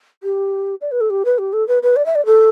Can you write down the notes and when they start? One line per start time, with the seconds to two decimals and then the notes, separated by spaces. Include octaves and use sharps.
0.23 G4
0.81 D5
0.92 B4
1.01 A4
1.10 G4
1.25 B4
1.38 G4
1.53 A4
1.68 B4
1.83 B4
1.96 D5
2.06 E5
2.15 D5
2.26 A4